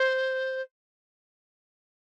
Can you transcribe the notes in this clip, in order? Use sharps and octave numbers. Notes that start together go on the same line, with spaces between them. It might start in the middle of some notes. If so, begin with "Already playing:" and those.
Already playing: C5